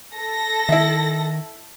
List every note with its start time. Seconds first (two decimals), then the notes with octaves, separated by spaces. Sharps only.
0.15 A4 A#6
0.69 D#3 E4 E5